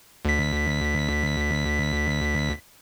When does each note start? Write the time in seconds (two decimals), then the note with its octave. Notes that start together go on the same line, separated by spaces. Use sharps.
0.25 D2 B6